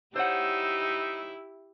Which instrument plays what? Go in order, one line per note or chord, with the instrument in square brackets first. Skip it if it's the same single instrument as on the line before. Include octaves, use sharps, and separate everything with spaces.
[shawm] D#4 [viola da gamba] E4 G4 [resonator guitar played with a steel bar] C5 C#5 F#5 [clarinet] E6